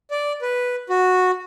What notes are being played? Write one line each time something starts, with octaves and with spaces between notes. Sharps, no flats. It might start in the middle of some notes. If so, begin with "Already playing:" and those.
D5
B4
F#4